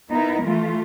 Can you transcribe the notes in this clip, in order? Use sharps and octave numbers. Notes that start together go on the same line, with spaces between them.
B3 D#4 E4 A#4
E3 A3 F4